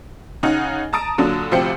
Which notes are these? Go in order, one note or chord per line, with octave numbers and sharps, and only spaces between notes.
C#3 D#4 F#5
A5 A#5 D#6 A6 D7
A#2 D3 F#3 D4
D2 C3 F3 G4 C5 C#7